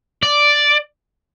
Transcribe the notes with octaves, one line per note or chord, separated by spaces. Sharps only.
D5